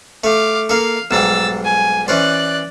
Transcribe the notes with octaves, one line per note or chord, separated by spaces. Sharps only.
A3 F5 D6
A#3 A4 F5
B1 G#2 G3 E6 A6
G#5
E3 C#4 C5 D5 F#6